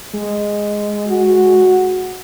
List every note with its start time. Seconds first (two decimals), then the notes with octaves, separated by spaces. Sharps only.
0.13 G#3
1.08 F#4